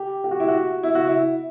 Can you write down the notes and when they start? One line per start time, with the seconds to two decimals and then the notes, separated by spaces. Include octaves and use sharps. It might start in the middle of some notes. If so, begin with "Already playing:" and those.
Already playing: G4
0.24 G4
0.31 F#4
0.40 E4
0.48 F#4
0.83 E4
0.95 F#4
1.07 E4